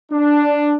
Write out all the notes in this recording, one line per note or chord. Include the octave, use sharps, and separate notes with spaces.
D4